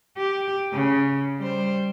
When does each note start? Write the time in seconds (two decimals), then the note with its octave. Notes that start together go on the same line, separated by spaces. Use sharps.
0.17 G4
0.73 C#3
1.39 G3 C5